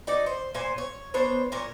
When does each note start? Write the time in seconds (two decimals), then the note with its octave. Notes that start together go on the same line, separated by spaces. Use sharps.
0.07 D#4 F#4 D5
0.26 C5
0.55 A#2 C5 G#5
0.78 C#5
1.14 B3 D4 C5 C#5
1.52 A#2 A#4 C#5